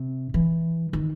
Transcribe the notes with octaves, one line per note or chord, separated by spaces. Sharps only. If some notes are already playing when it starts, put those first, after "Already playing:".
Already playing: C3
E3
D#3